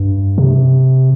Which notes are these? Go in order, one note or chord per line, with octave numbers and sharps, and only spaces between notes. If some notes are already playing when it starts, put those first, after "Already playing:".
Already playing: G2
C3